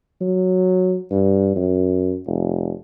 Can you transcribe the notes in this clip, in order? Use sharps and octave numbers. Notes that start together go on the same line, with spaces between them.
F#3
G2
F#2
F1